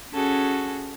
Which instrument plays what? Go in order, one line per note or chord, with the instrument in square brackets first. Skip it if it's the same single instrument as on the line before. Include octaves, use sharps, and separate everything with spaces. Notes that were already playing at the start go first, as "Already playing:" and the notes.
[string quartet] C#4 F#4 G#4 A4